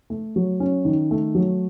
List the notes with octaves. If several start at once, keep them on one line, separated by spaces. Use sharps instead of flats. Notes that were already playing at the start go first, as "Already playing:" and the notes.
A3
F#3
C#4
D#3
A3
F#3